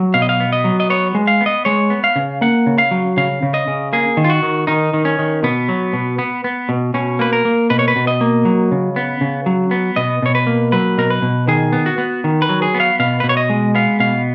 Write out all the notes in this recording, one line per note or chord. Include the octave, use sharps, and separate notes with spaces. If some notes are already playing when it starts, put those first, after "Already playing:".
Already playing: F#3
B2 F5
D#5
F5
B3
D#5
F#3
D#5
B3 C#5
G#3
F5
B3
D#5
G#3 C#5
B3
F5
C#3
A#3 F#5
C#3
F5
F#3
C#3 F5
C#3
D#5
C#3
A#3 G#4
D#3
F4
F#4
D#3
D#3 D#4
D#3
C#4
D#3
B2 B3
F#3
B2
B3
B3
B2
B2 C#4
A#3 B4
A#4
A#3
B2 B4
C#5
B4
B2
D#5
A#3
F#3
C#3
B3
C#3
F#3
B3
B2 D#5
B2 C#5
B4
A#3
F#3 B4
B2 A#4
B4
B2
D#3 G#4
B3
F#4
B3
D#3
B4
F#3
G#4
B3
F5
B2 F5
B4
B2
C#5
D#5
G#3
B3 F5
B2 F5